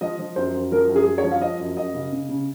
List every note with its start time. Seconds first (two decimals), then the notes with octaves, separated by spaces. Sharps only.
0.01 F3 D#5
0.19 F3
0.36 F#2 C5
0.55 F#2
0.72 F3 A#4
0.89 F#2
0.96 G#4
1.07 F#2
1.18 C#5
1.24 F3
1.31 F5
1.41 F3 D#5
1.60 F#2
1.77 F#2 D#5
1.94 C#3
2.13 C#3
2.29 C#3